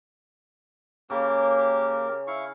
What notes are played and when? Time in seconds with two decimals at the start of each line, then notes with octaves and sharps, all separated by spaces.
1.10 C#3 A#3 G4 A#4
2.27 E4 F5 C#6